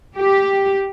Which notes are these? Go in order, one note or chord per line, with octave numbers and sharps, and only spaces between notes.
G4